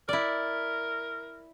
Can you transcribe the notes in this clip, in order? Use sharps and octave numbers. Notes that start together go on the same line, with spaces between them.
E4 A#4 D5